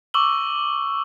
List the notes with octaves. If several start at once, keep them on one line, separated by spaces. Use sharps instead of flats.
C#6 D6 E6 F#7 G7